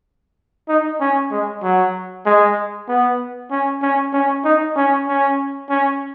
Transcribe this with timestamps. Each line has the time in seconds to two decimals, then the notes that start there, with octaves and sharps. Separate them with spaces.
0.68 D#4
1.01 C#4
1.31 G#3
1.63 F#3
2.26 G#3
2.89 B3
3.51 C#4
3.83 C#4
4.13 C#4
4.45 D#4
4.76 C#4
5.08 C#4
5.70 C#4